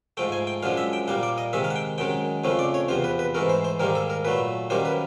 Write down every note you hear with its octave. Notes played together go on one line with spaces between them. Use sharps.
G#2 F3 A3 G5
G#5
G5
F#2 D3 F3 G#3 F5
E5
G5
A#2 G3 A#3 F#5
D5
D#5
C3 D#3 G#3 E5
F5
F#5
G5
F#2 D#3 G#3 G5
F2 C#3 F3 A3
D5
C#5
E2 C3 F3 C5
B4
B4
G#2 E3 A3 A#4
C5
C5
G#2 D#3 G3 A#3 A#4
A4
A#4
A#2 F#3 A3 B4
F#2 D#3 G3 A#3 C5
B4